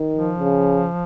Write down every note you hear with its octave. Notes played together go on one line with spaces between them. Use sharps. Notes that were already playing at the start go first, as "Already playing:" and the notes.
Already playing: D#3
F3
C#3